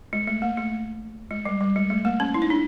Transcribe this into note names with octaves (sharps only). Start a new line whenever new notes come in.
G#3
A3
A#3
A3
G#3
G3
G3
G#3
A3
A#3
C#4
E4
D#4
D4